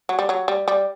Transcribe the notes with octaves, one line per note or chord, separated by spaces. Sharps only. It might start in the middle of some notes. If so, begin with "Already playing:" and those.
F#3
G3
F#3
G3
G3